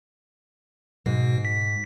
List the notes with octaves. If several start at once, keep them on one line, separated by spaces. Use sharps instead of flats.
G#2 B2
B6